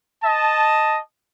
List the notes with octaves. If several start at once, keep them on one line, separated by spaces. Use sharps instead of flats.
D#5 A5